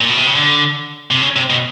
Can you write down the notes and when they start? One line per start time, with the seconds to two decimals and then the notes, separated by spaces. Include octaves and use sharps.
0.01 A#2
0.09 B2
0.17 C3
0.27 C#3
0.35 D3
1.11 C3
1.21 C#3
1.36 C3
1.50 B2